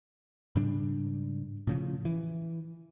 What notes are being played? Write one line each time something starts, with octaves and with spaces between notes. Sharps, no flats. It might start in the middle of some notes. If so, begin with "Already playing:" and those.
G#2 C#3 G3 D4
A2 C#3 F3
E3